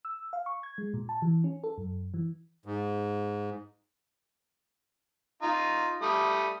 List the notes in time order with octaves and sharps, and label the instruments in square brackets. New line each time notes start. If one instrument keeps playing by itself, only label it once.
[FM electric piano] E6
F5
C#6
G#6
G#3
A#2
A5
E3
C#4
A4
F#2
E3
[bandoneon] G#2
[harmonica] D#4 F4
G3 A3 D#6